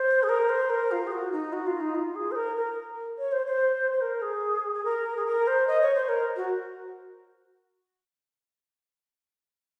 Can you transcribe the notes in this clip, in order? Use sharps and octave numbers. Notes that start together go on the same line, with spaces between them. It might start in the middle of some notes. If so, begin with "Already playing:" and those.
Already playing: C5
G#4
A#4
C5
A#4
F4
G#4
F#4
D#4
F#4
F4
D#4
F4
G#4
C5
A#4
A#4
C#5
C5
C5
C5
A#4
G#4
G#4
A#4
G#4
A#4
C5
D#5
C#5
C5
A#4
F#4